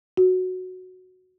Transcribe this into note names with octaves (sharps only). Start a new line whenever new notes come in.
F#4